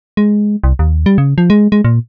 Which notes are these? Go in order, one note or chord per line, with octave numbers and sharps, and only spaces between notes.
G#3
C2
D#2
G3
C#3
F3
G#3
G#3
A#2